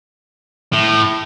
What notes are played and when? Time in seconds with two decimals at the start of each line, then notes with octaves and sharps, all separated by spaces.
0.73 A2